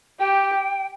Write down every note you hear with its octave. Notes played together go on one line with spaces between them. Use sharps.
G4 G5